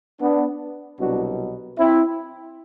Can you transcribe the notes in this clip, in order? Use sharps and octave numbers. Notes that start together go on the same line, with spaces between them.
B3 D4
C2 B2 F#3 D4 F#4
C4 E4